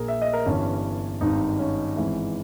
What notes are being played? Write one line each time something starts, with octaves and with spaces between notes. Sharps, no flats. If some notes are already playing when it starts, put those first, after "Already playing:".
Already playing: A#1 A#2 G#4 A#4
E5
D#5
A#4
G1 G2 E3 C#4
G#1 G2 D#3 D#4
C#4
G#1 G#2 E3